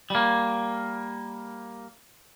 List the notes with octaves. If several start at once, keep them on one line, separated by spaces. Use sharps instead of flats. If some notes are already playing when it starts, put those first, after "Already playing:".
G3 A#3